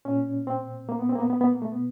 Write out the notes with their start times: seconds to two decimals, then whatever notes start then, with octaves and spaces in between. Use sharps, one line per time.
0.05 A#2 C#4
0.47 C4
0.89 A#3
0.99 B3
1.09 C4
1.15 A#3
1.20 B3
1.30 B3
1.41 B3
1.52 A#3
1.62 A3
1.72 B2 B3